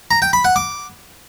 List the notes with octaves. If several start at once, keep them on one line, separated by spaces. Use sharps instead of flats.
A#5
G5
B5
F#5
D6